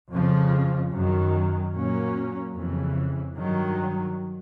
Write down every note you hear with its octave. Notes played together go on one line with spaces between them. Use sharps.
F2 C#3 F3
F#2 D#3 F#3
A#2 F#3 A#3 C#4
F2 C#3 E3
G2 D#3 F#3